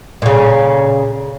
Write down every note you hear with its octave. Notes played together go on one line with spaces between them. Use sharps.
A#2 C#3